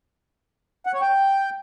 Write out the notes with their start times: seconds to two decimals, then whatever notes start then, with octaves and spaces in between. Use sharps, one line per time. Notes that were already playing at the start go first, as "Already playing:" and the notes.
0.86 F#5
0.94 C#5
1.01 G5